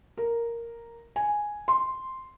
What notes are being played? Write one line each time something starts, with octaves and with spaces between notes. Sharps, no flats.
A#4
G#5
C6